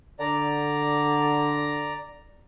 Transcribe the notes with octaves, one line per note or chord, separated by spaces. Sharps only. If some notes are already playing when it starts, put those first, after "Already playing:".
D3 D5 A#5